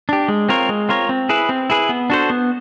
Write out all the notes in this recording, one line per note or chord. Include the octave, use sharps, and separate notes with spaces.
D4 G4
G#3
C4 F4 A#4 C#5
G#3
C4 F4 A#4 C#5
C4
E4 G#4 B4
C4
E4 G#4 B4
B3
D4 F#4 A4 C5
B3